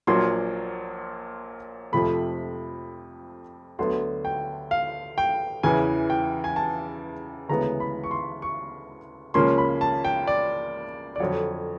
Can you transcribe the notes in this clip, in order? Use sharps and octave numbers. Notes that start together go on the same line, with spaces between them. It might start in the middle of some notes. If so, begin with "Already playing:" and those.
A#1 A#2 F#3 A#3 C6
F2 C3 F3 A3 B5
D2 D3 F#3 B3 C6
G5
F5
G5
E2 C#3 E3 G#5
G5
G#5
A5
D2 C#3 E3 G#3 B3 A#5
B5
C#6
C6
C#6
C#2 C#3 F3 A#3 C#4 C6
B5
A5
G5
D5
D5
F2 D3 F#3 C#5